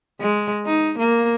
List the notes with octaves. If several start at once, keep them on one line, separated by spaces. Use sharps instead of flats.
G#3
D#4
A#3